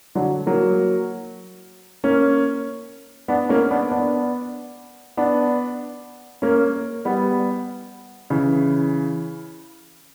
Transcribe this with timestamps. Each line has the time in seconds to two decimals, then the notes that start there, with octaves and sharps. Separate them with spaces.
0.15 D3 F#3
0.47 F#3 A#3
2.04 A#3 C#4
3.28 B3 D4
3.49 A#3 C#4
3.70 B3 D4
3.91 B3 D4
5.17 B3 D4
6.42 A#3 C#4
7.05 G3 B3
8.30 C#3 E3